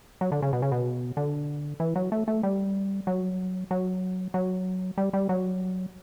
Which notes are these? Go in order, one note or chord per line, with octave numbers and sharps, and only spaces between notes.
F#3
D3
C#3
B2
C#3
B2
D3
E3
F#3
A3
A3
G3
F#3
F#3
F#3
G3
G3
F#3